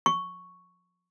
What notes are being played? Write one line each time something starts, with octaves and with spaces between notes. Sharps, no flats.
C#6